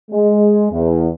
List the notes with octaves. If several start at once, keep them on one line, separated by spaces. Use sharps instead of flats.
G#3
E2